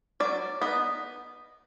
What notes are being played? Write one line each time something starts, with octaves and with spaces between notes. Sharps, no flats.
F#3 D5
B3 D#4